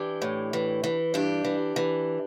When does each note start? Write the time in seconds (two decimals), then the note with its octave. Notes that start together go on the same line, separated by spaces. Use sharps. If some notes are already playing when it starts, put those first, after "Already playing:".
Already playing: E3 D4 G4
0.22 A2
0.53 E3
0.84 E3
1.14 G2 D4 G4
1.44 E3
1.76 E3